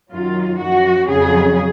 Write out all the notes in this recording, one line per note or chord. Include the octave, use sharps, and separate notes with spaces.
F#2 D#3 F#3 F4
F#2 F3 F#4
F2 C#3 F#3 G#4